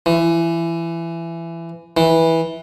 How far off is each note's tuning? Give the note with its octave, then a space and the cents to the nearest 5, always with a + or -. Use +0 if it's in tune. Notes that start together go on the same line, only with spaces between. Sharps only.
E3 +20
E3 -15